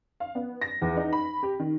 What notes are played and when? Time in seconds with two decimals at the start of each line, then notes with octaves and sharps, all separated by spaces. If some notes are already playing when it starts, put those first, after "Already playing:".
0.20 F5
0.35 B3
0.62 A#6
0.82 E2
0.97 D#4
1.13 B5
1.43 G4
1.59 D#3